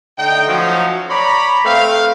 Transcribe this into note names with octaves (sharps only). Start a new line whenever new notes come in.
D3 A3 D#4 G5
F3 F#3 A3 C#4 D#4 F#4
C#5 D5 A#5 B5
A3 C4 B4 F5